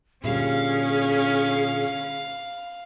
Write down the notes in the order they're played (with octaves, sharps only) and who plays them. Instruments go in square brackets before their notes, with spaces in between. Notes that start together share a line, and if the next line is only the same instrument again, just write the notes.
[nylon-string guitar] A#2 D3 G3 [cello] C#4 [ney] G#4 [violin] F5